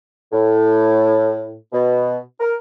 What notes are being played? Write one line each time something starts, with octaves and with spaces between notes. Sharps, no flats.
A2
B2
A#4